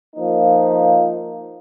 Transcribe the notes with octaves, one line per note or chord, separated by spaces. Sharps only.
F3 A#3 D#4